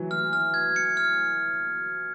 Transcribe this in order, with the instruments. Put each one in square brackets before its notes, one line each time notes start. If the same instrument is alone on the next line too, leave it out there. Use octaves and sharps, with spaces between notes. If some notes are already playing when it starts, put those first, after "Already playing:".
Already playing: [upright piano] E3 F#3
[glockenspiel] F6
F6
G#6
C#7
F6